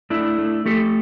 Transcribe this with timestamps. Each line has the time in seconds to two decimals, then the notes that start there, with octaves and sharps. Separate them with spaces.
0.10 A3 D4 E4
0.38 A3
0.66 A3 G4 A4